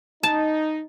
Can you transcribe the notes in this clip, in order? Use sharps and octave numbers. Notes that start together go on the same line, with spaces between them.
D#4 A5